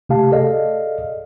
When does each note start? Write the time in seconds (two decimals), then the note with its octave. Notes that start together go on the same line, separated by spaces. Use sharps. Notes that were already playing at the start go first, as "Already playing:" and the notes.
0.09 C3 A3 G4 F5 A5
0.32 G#4 A4 D5 D#5 F5